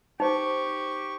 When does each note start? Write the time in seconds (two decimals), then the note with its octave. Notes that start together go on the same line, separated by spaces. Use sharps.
0.20 D#4 G4 C5 C#6